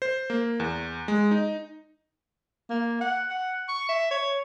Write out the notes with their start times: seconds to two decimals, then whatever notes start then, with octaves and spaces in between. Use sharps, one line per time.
0.02 C5
0.30 A#3
0.60 E2
1.08 G#3
1.31 D#4
2.70 A#3
3.01 F#5
3.30 F#5
3.68 C#6
3.89 E5
4.11 C#5